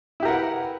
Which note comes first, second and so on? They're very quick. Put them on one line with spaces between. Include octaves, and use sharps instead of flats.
E4 G4 A#4 F#5 B4